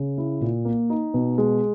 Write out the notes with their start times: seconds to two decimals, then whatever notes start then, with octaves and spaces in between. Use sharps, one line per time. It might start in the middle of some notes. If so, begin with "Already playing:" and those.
Already playing: C#3
0.18 E4
0.41 A#2
0.65 A#3
0.90 D#4
1.14 B2
1.38 G#3